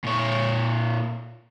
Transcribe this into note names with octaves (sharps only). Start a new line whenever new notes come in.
A#2 C#5